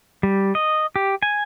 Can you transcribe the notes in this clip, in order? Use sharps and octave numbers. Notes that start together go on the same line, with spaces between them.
G3
D#5
G4
G#5